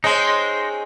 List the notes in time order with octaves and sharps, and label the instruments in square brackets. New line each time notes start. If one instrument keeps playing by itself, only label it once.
[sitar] G#3 C4 C#4 [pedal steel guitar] D#4 C5